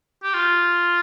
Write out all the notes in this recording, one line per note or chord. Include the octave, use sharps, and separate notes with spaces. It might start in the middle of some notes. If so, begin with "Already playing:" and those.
G4
F4